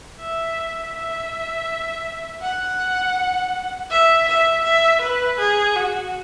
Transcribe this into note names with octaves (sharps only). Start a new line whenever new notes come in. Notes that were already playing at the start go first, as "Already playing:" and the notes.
E5
E5
F#5
E5
E5
E5
B4
G#4
F#4